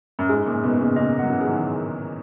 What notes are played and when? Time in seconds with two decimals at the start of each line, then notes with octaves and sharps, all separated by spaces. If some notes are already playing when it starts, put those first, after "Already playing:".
0.19 F#2
0.29 G#2 G#4
0.46 F#2 A#2
0.52 G#4
0.63 G#2 B2
0.74 G#4
0.79 A#2 C#3
0.96 A#2 C#3 D#5
1.19 F#3 F#5
1.30 C#3 E3
1.41 G#4
1.47 D#3 F#3